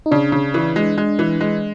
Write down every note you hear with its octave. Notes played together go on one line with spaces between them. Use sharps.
D#4
C#3 D4
C#3
E3
G#3
G#3
E3
G#3